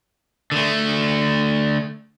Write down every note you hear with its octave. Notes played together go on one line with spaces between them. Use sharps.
D3 A3